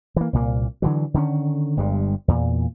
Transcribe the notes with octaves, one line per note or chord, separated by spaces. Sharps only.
E3 A#3
C2 A#2 A#3
D3 E3 F#3
D3 D#3 B3 C#4
G1 G2 G3 G#3
E2 A#2